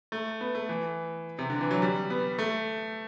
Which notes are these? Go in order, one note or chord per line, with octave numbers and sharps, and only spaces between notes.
A3
B3
A3
E3
C3
D3
E3
F#3
G3
B3
A3